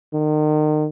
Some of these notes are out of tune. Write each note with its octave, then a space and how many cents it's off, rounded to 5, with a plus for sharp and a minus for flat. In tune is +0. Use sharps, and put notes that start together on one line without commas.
D#3 -35